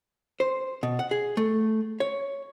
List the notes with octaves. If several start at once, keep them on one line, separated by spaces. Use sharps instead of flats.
C5
B2
F#5
G#4
A3
C#5